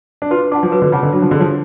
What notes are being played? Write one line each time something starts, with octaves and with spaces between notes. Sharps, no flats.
D4
F4 B4
D4 F#5 A5 D6
F3
F#3 B4
D3
C#3 F#5 A5 D6
D3
F#3 D4
F3
D3 G#4
F3 C#5